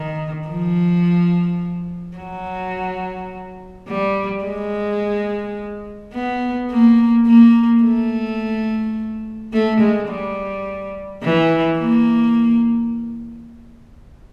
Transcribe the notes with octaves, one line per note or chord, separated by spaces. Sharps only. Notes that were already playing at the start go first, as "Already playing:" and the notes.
Already playing: D#3
F3
F#3
G3
G#3
B3
A#3
A#3
A3
A3
G#3
G3
E3
A#3